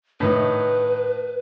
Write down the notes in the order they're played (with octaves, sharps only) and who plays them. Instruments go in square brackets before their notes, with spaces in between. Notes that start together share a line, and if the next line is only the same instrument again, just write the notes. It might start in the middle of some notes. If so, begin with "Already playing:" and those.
[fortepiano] A2 D#3 D#4 [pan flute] B4